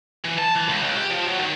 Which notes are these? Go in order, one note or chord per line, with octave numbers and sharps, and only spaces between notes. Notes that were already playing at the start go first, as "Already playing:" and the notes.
E3
A5
E3
C#2
C#2
G4
F3
F#3
D#3